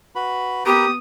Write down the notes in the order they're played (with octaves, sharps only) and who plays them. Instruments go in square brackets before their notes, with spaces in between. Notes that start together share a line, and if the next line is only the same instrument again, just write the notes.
[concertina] F#4 B4 B5
[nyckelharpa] B3 D#6 [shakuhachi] G4 [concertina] A#4 B4 A#5